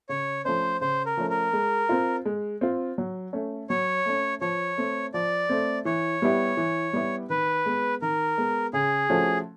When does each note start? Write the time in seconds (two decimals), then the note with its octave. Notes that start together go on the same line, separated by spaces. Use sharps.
0.09 C#3 C#5
0.45 F3 A3 C#4 C5
0.81 C#3 C5
1.06 A#4
1.17 F3 A3 C#4
1.30 A#4
1.53 G#3
1.89 C4 F4
2.25 G#3
2.61 C4 F4
2.98 F#3
3.33 A3 C#4
3.69 F#3 C#5
4.06 A3 C#4
4.41 F3 C#5
4.78 A3 C4
5.14 F3 D5
5.49 A3 C4
5.85 E3 C#5
6.22 G3 B3 E4 G4
6.57 E3
6.93 G3 B3 E4 G4
7.30 D#3 B4
7.66 G#3 B3
8.02 D#3 A#4
8.38 G#3 B3
8.73 C#3 G#4
9.10 F3 A3 C#4 F#4